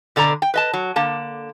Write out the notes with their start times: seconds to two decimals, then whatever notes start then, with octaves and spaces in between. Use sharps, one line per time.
0.16 B2 D3 D4 A#5
0.42 G5
0.54 B4 D#5 A5
0.74 F#3
0.96 D3 A#3 A5